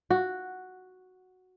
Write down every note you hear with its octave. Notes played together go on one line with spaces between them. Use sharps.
F#4